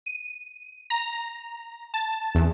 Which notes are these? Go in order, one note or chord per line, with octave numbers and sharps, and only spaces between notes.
D#7
A#5
A5
E2